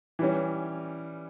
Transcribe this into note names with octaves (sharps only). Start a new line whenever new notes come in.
E3 G3 C#4